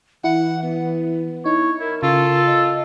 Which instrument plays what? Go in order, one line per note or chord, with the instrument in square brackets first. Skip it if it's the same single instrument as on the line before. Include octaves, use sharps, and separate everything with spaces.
[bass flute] E3 [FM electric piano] E4 [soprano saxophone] F#5
[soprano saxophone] B3
[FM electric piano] D#4 [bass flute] E4 [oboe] C#5
[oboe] E4 [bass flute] A#4
[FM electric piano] C#3 [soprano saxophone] F4 [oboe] A4
[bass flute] D#5